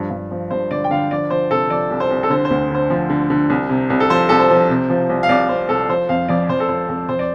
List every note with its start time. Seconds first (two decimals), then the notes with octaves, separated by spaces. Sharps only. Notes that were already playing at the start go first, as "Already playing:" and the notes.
Already playing: G2 F3
0.10 G2
0.31 F3
0.51 G2 C5
0.71 D3 D5
0.84 G5
0.90 D3 F5
1.11 F3 D5
1.30 F3 C5
1.50 C3 A4
1.70 F3 D5
1.91 C2
2.00 C5
2.10 C2
2.23 A4
2.30 D3 C5
2.45 C5
2.50 D2
2.70 D3 C5
2.90 F3
3.10 D3
3.30 D3
3.50 C2
3.69 C3
3.90 C2
4.00 A4
4.10 F3 C5
4.29 C2 A4
4.39 C5
4.50 F3
4.69 C3
4.90 F3
5.09 C2
5.23 F5
5.29 C2 D5
5.49 C2 C5
5.69 C2 A4
5.89 F3 C5
6.09 F2 F5
6.28 F2 D5
6.49 F2 C5
6.60 A4
6.69 F3 C5
6.89 F2 A4
7.09 F2 C5
7.19 D5